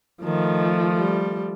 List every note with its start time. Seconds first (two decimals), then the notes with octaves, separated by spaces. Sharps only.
0.24 D#3 F3 A3
0.97 G3